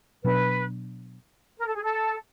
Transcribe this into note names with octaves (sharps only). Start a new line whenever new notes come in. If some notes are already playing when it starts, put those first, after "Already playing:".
B2 F#3 B3 D4 B4
A#4
A4
G#4
A4